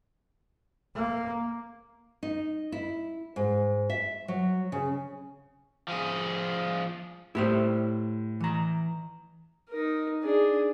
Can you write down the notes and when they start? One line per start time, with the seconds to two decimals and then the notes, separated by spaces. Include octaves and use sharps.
0.95 A#3
2.23 D#4
2.72 E4
3.36 G#2
3.90 E5
4.28 F#3
4.72 C#3
5.88 F3 G#4
7.35 A2 E4 G4 C5
8.40 E3 A#5
9.69 D#4 A#4
10.23 D4 G#4